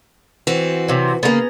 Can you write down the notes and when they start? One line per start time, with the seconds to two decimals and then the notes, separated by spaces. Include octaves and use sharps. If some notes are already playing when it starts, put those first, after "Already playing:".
0.47 E3 C4 F#4
0.88 C3 F#3
1.23 C#3 A#3 B3 G#4 A#5